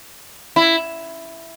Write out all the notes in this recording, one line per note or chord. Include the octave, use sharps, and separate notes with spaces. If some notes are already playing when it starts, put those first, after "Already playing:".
E4